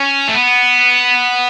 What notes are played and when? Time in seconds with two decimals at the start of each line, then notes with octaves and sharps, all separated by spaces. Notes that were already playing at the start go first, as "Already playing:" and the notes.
Already playing: C#4
0.28 A3
0.34 B3